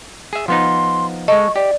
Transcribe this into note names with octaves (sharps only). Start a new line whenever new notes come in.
G#4 E5
F3 B3 D#4 C6
G#3 A4 D#5 C#6
G4 D5